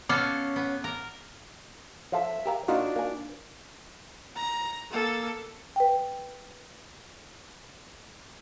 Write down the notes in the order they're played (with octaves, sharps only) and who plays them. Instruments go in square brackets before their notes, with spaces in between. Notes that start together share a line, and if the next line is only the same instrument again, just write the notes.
[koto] B3 A4 [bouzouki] C#4 F5 [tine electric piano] D6
[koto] B3
A#4
[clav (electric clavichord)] F3 F4 A4 [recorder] E5
[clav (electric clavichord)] G4 A#4 F5
[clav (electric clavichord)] A#2 A#3 A#5 [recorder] D4 [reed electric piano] D#4 F4 F#4
[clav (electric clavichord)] A#3 G#5
[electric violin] A#5 A#6
A#3 A4
[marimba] B4 G5